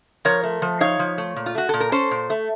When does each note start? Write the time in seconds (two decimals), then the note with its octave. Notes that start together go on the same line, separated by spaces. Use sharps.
0.25 F3 A#4 C#5
0.43 A3
0.62 F3
0.80 D#4 C#5 F5
0.99 F3
1.18 A3
1.36 A#2
1.46 F4
1.55 A3 F#4
1.69 A#2 A4
1.80 A#4
1.92 C#4 A4 C5
2.11 A#2
2.30 A3